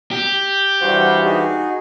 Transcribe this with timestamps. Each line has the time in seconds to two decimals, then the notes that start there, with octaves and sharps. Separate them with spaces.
0.11 G4
0.81 G2 E3 G3 F#4 C5 F#5
1.25 D#4 F#4 G#4